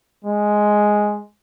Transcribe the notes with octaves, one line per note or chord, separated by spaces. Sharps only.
G#3